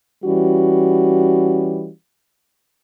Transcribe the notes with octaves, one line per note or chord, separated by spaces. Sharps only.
E3 G3 C#4 F#4